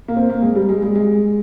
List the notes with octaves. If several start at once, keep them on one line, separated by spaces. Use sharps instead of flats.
A#3
C4
A#3
G#3
G3
G#3
G#3
G#3